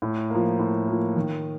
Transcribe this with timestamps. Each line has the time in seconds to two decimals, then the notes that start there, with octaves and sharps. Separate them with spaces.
0.02 A2
0.30 F3 A#3
0.59 A2
0.88 F3 A#3
1.16 D#3